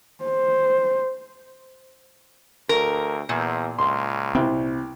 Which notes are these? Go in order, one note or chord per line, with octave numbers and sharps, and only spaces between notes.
C5
D2 A#4
E2 A#2
C#2 C6
C2 C4